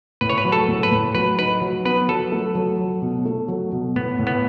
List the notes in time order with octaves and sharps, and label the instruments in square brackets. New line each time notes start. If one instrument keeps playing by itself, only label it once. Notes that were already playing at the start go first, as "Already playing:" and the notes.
[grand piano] A2 [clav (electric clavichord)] B4
[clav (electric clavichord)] C#5
B4
[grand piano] F#3
[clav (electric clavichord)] A4
[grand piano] A2
[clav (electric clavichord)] B4
[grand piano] A2
[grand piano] F#3 [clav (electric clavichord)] B4
[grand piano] D#4 [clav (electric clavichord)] B4
[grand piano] F#3
[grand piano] B3 [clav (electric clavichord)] B4
[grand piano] F#3 [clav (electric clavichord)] A4
[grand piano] A3
F#3
F#3
B2
A3
F#3
B2
[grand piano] A2 [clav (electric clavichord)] B3
[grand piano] A2
[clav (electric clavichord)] B3